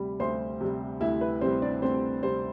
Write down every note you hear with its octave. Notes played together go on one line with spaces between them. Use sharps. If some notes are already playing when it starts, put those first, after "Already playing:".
Already playing: D2 C3 G3 B5
D2 C5 C6
C3 G3
D2 E4 E5
B4
C3 G3 C4 C5
D4 D5
D2 C4 C5
C3 G3 C4 C5